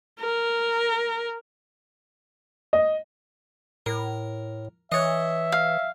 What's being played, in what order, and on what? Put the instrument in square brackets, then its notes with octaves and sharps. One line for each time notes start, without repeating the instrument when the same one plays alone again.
[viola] A#4
[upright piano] D#5
[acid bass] A2 [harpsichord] A#4
[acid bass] E3 [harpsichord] C#5 D#5 [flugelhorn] E5
[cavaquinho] F5